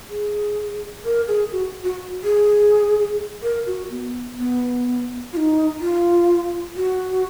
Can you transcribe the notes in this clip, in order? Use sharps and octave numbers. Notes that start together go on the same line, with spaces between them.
G#4
A#4
G#4
F#4
F#4
G#4
A#4
F#4
B3
B3
F4
D#4
F4
F#4